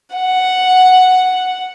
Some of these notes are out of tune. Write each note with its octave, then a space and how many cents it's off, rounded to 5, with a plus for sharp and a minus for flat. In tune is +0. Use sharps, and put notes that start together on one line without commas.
F#5 +0